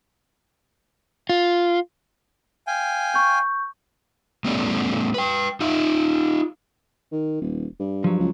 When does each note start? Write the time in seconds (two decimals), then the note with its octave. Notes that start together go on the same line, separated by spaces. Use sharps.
1.29 F4
2.67 F5 G5 G#5
3.14 C#6 G6
4.45 A2 G3 A3 B3 C#4 D5
5.14 B4 G5
5.60 D#4 F4 E5
7.12 D#3
7.41 D#1
7.79 G2
8.04 F3 F#3
8.19 C#2